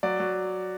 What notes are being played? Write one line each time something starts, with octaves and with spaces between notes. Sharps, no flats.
F#3 D5
F#3